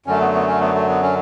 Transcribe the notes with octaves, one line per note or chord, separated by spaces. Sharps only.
F#2 D3 F#3 A3 C#4
B3
B3
C#4
B3
A3
B3
C#4